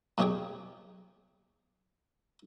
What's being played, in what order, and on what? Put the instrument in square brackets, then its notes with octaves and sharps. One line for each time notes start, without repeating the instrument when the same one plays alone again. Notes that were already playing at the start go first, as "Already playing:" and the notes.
[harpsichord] F#2 B2 C#4 G4 G#4 G5